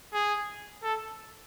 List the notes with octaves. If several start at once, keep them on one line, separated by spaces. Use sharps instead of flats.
G#4
A4